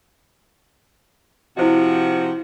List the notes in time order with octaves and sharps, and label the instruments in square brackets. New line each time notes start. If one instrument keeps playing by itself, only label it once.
[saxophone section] C3 F3 F#4 [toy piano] E4 C5 D#5